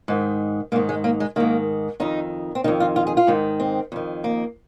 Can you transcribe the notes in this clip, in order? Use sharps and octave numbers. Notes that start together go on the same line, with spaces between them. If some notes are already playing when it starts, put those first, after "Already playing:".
G#2 D#3
G#2 D#3 A#3
G#3
A#3
G#3
G#2 D#3 A#3
F2 D#3 D#4
C4
F2 D#3 D#4
F4
F4
G#4
F4
G#2 D#3
C4
F2 D#3
A#3